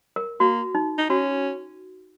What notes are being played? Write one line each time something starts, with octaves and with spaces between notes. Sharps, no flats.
A#4
A#3 F#4
D#4
D#4
C#4 F#4